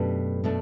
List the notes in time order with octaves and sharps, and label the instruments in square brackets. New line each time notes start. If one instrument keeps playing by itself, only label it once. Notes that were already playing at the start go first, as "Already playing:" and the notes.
Already playing: [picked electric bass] F#2 [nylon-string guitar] B2 A3 D4 G4
[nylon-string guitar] B2 A3 D4